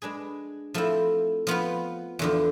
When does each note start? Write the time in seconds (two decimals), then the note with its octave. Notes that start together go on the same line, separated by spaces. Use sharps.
0.02 G#3 D4 G#4 B4
0.74 F3 A3 C4 E4
1.47 F3 B3 F4 B4
2.19 E2 D3 F3